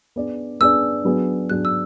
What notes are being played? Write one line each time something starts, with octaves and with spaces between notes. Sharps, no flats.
B3 D4 G#4 D5
B3 D4 G#4 D5 E6
F#3 B3 D4 G#4
F#3 B3 D4 G#4 F#6
E6